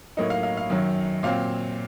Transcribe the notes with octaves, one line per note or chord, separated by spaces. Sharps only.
A2 F#3 A#3 D#4 D#5
F5
F5
F5
F#2 D#3 F#3
A#2 F#3 C4 F5